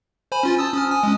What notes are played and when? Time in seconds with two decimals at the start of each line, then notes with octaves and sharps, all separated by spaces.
0.32 C5 G#5 B5
0.43 C#4 F4 A6
0.58 A5 D#6 E6
0.74 C#4 D#6 F6
0.88 G#5 D#6
1.03 G#3 C#4